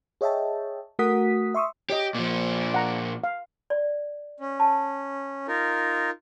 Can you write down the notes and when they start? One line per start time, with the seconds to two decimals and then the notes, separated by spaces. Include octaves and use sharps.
0.21 G#4 C#5 D#5 E5 G5 A5
0.99 A3 F#4 A#4 F#5 D#6 B6
1.54 E5 C6 C#6 D#6 E6
1.90 G4 C#5 D#5
2.15 A#2 F3
2.74 F#5 A#5
3.24 F5
3.70 D5
4.40 C#4
4.60 A5
5.48 D#4 F4 A#4